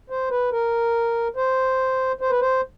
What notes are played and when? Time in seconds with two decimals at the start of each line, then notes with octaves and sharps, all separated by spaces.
0.10 C5
0.31 B4
0.52 A#4
1.36 C5
2.21 C5
2.30 B4
2.41 C5